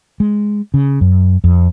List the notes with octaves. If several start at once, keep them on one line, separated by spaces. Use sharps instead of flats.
G#3
C#3
F#2
F2